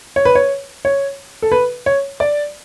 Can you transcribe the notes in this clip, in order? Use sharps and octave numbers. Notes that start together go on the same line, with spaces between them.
C#5
B4
C#5
C#5
A4
B4
C#5
D5